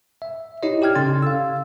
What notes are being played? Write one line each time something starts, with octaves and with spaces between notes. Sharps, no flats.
E5
D#4 E4 G4 C#5 D#5
G4 D5 G5 F6 G#6
C#3 C#4 A4 C6 A6
F5 E6